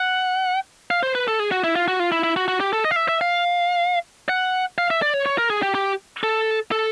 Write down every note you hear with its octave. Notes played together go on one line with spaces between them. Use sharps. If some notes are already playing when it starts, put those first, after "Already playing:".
Already playing: F#5
F5
C5
B4
A4
G#4
F#4
E4
F4
F#4
F4
E4
E4
F#4
F#4
G4
A4
D#5
F5
E5
E5
F5
F#5
F5
E5
D5
C#5
C#5
A#4
G#4
G4
G4
A4
A4